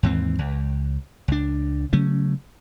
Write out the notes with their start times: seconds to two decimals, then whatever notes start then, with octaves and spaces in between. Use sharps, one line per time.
0.03 D#2 G#2 E3 C4
0.39 C#2
1.28 C#2 D4
1.93 C#3 F#3 A3 C#4